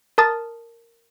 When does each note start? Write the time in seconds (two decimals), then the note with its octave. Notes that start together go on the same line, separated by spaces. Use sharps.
0.18 A#4 A5 D#6 A6